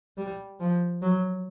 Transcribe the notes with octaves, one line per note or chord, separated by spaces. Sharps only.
G3
F3
F#3